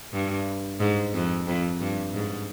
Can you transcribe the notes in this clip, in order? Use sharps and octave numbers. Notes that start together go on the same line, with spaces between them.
G2
G#2
F2
F2
G2
G#2